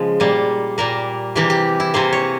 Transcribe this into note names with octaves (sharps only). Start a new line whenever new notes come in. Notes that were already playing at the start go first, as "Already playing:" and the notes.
Already playing: C#3 F3 G#3
A#2 G3 A#3
A#2 G3 A#3 A#4
C3 E3 A#3 G4
G4
E4
C3 E3 A#3 C5
C#5